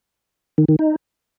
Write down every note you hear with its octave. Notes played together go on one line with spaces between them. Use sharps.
D#3
D#3
D#4